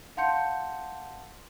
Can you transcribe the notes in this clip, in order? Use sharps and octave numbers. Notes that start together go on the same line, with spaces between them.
F5 F#5 A5 C6 G6 C#7